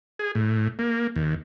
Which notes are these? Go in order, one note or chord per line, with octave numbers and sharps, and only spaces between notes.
G#4
A2
A#3
D#2